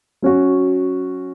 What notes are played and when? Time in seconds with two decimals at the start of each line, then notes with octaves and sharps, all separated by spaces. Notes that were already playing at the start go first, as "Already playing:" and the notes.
0.22 F#3 C#4 F#4